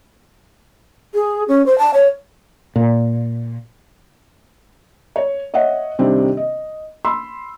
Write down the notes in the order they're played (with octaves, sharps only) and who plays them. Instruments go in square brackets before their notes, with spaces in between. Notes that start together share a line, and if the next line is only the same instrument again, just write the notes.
[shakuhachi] G#4
C#4
C5
A5
C#5
[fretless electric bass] A#2
[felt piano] C#5
C#5 D#5 E5 F#5
C3 D#3 G3 C4 D4
D#5
B5 C6 E6